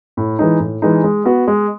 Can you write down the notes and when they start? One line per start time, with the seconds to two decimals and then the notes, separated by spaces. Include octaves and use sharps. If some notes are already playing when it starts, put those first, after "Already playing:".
0.17 A2
0.39 E3 G#3 D#4
0.60 A2
0.82 E3 G#3 D#4
1.04 G#3
1.25 B3 F#4
1.48 G#3